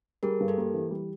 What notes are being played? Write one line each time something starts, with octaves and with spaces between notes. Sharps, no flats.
G3 G#4 A#4
G2
G4 A4
A#3
E3
G3